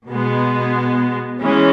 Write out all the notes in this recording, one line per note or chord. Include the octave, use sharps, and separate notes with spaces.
B2 G#3 B3
E3 G#3 C#4